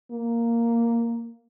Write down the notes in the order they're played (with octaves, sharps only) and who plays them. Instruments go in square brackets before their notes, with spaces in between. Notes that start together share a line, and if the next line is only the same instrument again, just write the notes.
[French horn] A#3